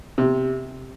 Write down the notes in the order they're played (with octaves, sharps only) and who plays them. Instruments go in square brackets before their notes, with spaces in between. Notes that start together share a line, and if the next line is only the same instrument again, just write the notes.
[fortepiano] C3